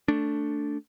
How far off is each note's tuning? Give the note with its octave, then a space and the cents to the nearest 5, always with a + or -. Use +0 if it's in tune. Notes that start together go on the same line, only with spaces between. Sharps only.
A3 +10 D4 -10